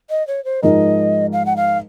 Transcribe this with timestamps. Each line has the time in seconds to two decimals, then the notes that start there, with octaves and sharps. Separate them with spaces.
0.10 D#5
0.27 C#5
0.45 C5
0.63 G#2 F3 G#3 D#4 A#4 D#5
1.33 F5
1.46 F#5
1.56 F5